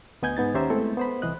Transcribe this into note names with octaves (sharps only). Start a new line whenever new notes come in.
D2 B3 D#5 G#5 G6 G#6
G#2 B3 D#4 A6
D#2 C#4 G4 C5 E5 A#5
G#3 A3 B3 C4 E4 A4
B3 C5 B5
C2 E3 D#5 F#6